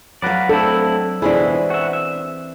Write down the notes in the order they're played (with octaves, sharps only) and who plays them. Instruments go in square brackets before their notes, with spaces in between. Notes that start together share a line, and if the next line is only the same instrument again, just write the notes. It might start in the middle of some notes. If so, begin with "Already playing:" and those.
[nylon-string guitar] F#3 F5 [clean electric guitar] F#4 B4 D5
[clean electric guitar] A3 C4 E4 [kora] D4 [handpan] A4
[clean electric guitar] C#2 B2 [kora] E3 C4 E4 [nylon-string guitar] D4 G#4
[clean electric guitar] F#4 E5
E5